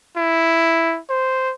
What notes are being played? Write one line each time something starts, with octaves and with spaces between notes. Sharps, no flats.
E4
C5